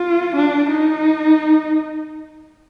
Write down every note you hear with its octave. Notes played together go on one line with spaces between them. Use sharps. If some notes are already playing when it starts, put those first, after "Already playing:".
Already playing: F4
D4
D#4